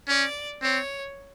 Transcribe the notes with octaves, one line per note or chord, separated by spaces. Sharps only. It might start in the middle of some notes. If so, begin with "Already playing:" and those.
C#4 D5
C4 C#5